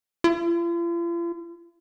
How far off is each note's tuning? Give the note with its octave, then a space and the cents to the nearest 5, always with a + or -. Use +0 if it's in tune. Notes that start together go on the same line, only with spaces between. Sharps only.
F4 -45